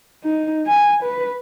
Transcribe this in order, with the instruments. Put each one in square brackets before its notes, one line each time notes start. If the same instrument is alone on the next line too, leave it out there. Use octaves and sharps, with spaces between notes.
[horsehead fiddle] D#4
G#5
B4